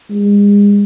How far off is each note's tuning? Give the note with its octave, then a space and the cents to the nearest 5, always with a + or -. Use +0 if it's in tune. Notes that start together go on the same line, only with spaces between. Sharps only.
G#3 -35